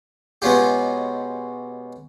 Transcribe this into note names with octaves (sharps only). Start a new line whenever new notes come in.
B2 G#3 B3 C#4 F4 G4